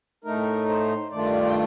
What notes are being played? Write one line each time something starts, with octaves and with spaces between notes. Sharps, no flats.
A2 A3 D#4 A#4
C5
G2 D#3 A3 D4 F4 D5
G5